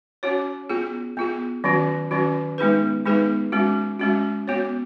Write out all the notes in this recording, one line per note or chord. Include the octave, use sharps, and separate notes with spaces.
C#4 F#4 C#5
B3 F4 G#4
B3 F4 G#4
D#3 F#3 C#4 F#4
D#3 F#3 C#4 F#4
G#3 B3 D#4 G#4 B4
G#3 B3 D#4 G#4 B4
G#3 C#4 F#4
G#3 C#4 F#4
B3 F#4 C#5